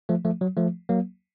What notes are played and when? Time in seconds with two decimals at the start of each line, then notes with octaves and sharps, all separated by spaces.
0.09 F3 A3
0.25 F3 A3
0.41 F#3
0.57 F3 A3
0.89 F#3 A#3